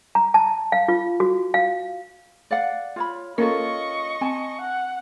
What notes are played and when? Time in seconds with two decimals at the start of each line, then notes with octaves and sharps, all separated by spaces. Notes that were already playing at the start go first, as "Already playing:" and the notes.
0.15 A#5
0.34 A5
0.72 F5
0.88 F4
1.20 F#4
1.54 F5
2.51 D5 F5 F#5
2.96 F4 C#5 B5
3.38 A#3 C#4 F4 A4 A#4 D#5 C#6
4.21 C4 G#5 A5
4.61 F#5